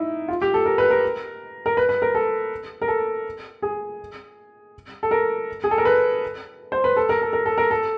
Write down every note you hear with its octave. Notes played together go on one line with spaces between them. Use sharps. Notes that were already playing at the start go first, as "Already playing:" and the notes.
Already playing: D#4 E4
F4
G4
A4
A#4
B4
A#4
A#4
B4
B4
A#4
A4
A#4
A4
G#4
A4
A#4
G#4
A4
A#4
B4
C5
B4
A4
A#4
A4
A#4
A4
A#4
A4